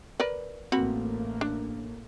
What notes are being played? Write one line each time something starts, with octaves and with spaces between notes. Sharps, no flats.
A#4 B4 D5
A1 A3 A#3 C4 F#4 B5
D4